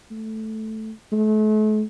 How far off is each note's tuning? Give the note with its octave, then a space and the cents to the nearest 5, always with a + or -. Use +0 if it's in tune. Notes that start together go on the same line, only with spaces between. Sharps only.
A3 -5
A3 -40